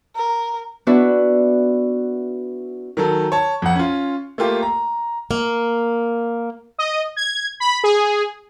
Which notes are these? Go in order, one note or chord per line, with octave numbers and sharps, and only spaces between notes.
A#4
B3 D4 E4 F#4 B4
D#3 F#3 A4
C#5 A5
F2 F#5
C#4 F4
A3 A#3 F4 G4
A#5
A#3
D#5
G#6
B5
G#4